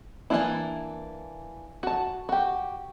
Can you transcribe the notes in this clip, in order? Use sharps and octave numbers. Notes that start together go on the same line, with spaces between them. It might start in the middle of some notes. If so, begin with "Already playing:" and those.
E3 A3 A#3 D4 E4
F#4 A5
F#4 G4